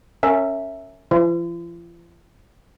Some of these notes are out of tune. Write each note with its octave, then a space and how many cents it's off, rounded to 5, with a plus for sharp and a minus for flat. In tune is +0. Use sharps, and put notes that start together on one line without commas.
C#4 +0 A#4 -30 E5 +0
F3 -45 F4 -45